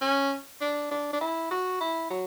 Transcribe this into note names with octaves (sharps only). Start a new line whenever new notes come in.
C#4
D4
D4
D4
E4
F#4
E4
F#3